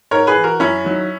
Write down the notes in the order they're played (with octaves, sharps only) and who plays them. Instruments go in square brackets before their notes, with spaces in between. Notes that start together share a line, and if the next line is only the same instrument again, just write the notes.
[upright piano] G#2 A#4 C#5
G#4 B4
E3
F#4 A#4
F#2 C#4 E4
D#3 F#3